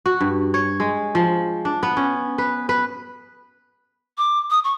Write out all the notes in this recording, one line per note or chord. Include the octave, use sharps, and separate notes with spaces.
F#4
G2
C#5
G#3
F3
D4
B3
C#4
B4
B4
D6
D#6
C#6